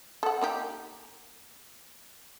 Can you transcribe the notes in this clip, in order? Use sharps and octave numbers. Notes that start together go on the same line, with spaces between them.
A4 F#5
A#3 D#4 G4